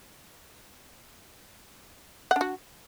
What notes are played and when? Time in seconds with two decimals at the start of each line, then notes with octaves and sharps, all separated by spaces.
2.31 F#5
2.36 D4
2.41 F#4